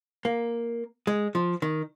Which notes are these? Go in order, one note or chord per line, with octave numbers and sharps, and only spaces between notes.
A#3
G#3
F3
D#3